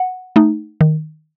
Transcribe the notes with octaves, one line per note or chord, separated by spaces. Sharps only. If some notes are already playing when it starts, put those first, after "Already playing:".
Already playing: F#5
A3 D#4
D#3